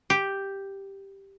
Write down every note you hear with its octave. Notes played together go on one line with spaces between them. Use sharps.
G4